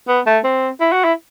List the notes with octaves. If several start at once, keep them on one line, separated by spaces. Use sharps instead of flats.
B3
A3
C4
E4
F#4
E4